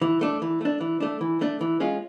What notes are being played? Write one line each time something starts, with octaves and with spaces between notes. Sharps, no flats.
E3
A3 D4
E3
A3 D4
E3
A3 D4
E3
A3 D4
E3
G#3 C#4 F4